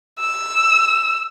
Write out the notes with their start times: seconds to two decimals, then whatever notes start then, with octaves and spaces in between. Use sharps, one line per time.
0.20 E6